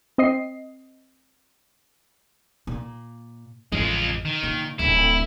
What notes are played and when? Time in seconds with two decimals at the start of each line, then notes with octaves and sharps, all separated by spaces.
0.18 C4 D#5 C7
2.67 A#2
3.72 A1 F2 G#3 F4
4.25 D#3
4.43 A#2
4.79 D1 A#1 E4